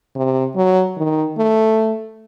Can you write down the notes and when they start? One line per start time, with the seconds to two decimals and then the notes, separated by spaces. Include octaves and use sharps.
0.16 C3
0.56 F#3
0.97 D#3
1.38 A3